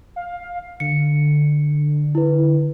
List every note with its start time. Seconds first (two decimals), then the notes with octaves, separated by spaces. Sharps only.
0.16 F5
0.80 D3 C#7
2.15 E4 B4